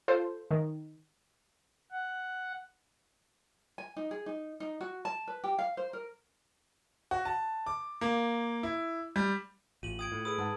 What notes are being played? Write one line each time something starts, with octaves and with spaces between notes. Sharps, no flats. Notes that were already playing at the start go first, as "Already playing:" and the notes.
F4 A4 C5
D#3
F#5
G#5
D#4
G#4
D#4
D#4
F#4
A5
B4
G4
F5
C5
A#4
F#4
A5
D6
A#3
E4
G3
A1 F4 D#7 F#7
G5 D#6 G#6 D7
A2
G#4 B4 B5 D#6 E6 D7
G#2 F#5 A5